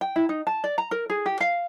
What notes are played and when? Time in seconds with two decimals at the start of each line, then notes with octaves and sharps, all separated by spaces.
0.01 G5
0.16 E4
0.29 D#4
0.47 A5
0.64 D5
0.78 A#5
0.91 A#4
1.10 G#4
1.26 G4
1.40 F5